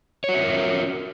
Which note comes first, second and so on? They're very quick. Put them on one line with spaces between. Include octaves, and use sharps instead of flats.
C#5 F#4 E5 F4 A#4